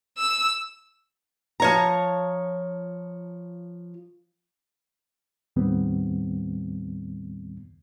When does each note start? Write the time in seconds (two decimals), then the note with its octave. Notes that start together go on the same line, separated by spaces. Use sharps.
0.18 E6
1.60 F3 C#5 A#5
5.56 D#2 A2 D#3 G3 B3 C4